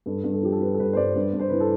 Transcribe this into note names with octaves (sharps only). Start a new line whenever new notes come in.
G2 A4
G2
A4
F3 G4
A4
F3 B4
A4
G2 B4
C5
G2 D5
G2
G2
C5
E3 B4
A4